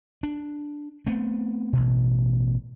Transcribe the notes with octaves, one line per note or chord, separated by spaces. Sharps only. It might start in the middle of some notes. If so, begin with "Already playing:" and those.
D4
A3 B3 C4
A1 B2